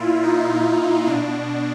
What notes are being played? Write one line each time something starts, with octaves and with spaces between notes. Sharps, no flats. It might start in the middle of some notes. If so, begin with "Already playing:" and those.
Already playing: A#2 E4 F4
D#4
B2 D4